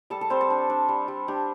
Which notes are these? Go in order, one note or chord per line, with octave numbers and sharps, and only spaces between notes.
G3 A4 A5
A4 A5
G3 C4 C5
A4
D4
D4
G3
G3
D4 G4